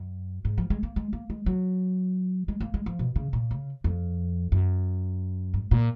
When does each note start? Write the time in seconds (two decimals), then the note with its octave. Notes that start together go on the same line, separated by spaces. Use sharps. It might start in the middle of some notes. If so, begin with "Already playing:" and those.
Already playing: F#2
0.45 G#2
0.58 F3
0.70 G#3
0.83 A#3
0.96 G#3
1.13 A#3
1.30 G#3
1.46 F#3
2.48 G#3
2.61 A#3
2.74 G#3
2.86 F3
2.99 B2
3.16 C#3
3.33 A#2
3.51 C#3
3.84 F2
4.52 F#2
5.54 G#2
5.71 A#2